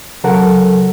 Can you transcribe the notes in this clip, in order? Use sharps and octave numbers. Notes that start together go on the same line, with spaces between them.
C#3 F#3 A4 A#4 F#5